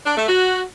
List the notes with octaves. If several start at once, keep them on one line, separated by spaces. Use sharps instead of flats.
D4
A3
F#4